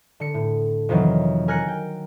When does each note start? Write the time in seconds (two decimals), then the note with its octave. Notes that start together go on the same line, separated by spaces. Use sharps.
0.20 D3 C#7
0.34 A2
0.89 F2 C3 D#3 E3 F#3
1.48 A#4 G#5 F6 F#6 A#6 C#7
1.68 G5